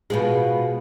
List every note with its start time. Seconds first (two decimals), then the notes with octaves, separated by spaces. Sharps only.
0.10 B2 F3 G#3